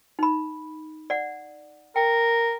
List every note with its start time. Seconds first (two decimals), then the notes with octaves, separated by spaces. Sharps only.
0.19 D#4 B5
1.10 D5 F#5
1.96 A#4 G5